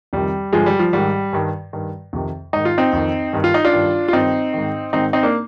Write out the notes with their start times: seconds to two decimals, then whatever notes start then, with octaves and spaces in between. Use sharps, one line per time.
0.13 F2 C3 D#3 G3
0.52 G2 D3 F3 G#3
0.66 G3
0.79 F3
0.93 G#2 D#3 G3
1.33 G2 D#3
1.73 G2 D#3
2.13 F2 C3 D#3
2.53 G#2 D#3 D#4
2.65 F4
2.78 C4 D#4
2.93 F2 D#3
3.33 G2 D#3
3.44 F4
3.54 D#4
3.65 D4 F4
3.73 G2 D#3
4.08 F4
4.13 G2 D#3 C4 D#4
4.53 G#2 D#3
4.93 G#2 D#3 C4 D#4
5.13 C4 D#4
5.23 A#3 D4